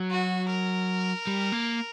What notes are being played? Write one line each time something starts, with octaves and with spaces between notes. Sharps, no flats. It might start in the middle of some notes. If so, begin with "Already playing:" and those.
Already playing: F#3
F#4
A#4
G3
A#3